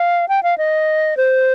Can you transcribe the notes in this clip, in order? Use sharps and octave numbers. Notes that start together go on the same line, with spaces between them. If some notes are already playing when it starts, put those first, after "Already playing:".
Already playing: F5
G5
F5
D#5
C5